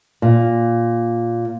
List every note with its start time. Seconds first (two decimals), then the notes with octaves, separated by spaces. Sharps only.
0.22 A#2